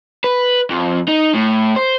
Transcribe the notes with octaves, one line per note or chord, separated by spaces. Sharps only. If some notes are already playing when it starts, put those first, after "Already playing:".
B4
F2
D#4
A2
C5